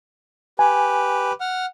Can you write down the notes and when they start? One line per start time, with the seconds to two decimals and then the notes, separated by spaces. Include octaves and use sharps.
0.59 G4 B4 G#5
1.41 F#5 F6